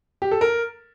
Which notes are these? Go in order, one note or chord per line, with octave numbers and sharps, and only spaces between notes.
G4
A4
A#4